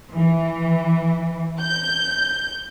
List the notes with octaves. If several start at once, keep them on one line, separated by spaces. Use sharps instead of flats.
E3
G6